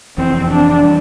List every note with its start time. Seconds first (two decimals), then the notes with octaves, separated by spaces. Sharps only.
0.17 F1 F2 E3 C4
0.51 D4
0.84 E3 G3 D4